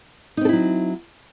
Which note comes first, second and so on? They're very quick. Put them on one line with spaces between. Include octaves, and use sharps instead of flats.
D#4 C4 A4 E4 F#3